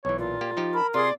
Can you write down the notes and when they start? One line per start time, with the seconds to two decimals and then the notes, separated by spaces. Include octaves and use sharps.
0.05 B1 E3 C#5
0.18 A#2 F4
0.41 A#3 G4
0.57 F3 D#4 G4
0.74 A#4 A5 B5
0.94 C3 F4 G#4 D5 C6 D#6